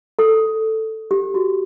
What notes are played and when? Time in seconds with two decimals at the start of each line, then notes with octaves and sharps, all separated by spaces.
0.19 A4
1.11 G4
1.34 F#4